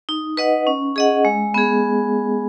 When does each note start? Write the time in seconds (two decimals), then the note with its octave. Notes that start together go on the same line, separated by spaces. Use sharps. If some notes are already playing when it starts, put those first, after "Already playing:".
0.09 D#4
0.37 B4 D#5 F#5
0.67 C#4
0.96 G#4 D#5 F#5
1.25 G#3
1.54 B3 G#4